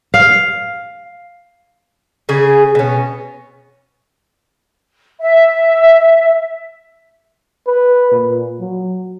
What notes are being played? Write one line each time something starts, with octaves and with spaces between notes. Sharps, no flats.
F5
C#3 G#4
B2 C#4
E5
B4
A#2
F#3